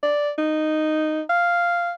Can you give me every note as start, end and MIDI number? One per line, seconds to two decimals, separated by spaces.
0.03 0.31 74
0.38 1.21 63
1.29 1.92 77